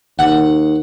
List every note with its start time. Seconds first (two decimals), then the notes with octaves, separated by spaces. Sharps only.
0.19 D#2 F#5